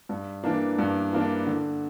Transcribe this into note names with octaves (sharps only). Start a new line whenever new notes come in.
G2
E3 A#3 D4
G2
E3 A#3 D4
D3